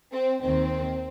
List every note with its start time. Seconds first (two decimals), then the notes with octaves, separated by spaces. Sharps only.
0.13 C4
0.42 D#2 D#3 C4